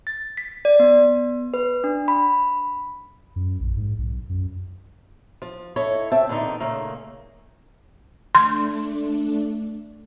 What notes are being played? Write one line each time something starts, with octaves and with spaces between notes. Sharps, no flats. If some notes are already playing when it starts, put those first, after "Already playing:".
A6
B6
D5
B3
B4
D4
B5
F#2
A#1
G#2
B1
F#2
F3
E4 A4 C#5 D#5
D2 C4 E5 A5
E2 A#2 D3 D#4 D5
A#2 C#3 A3 A#3
A3 D4 C6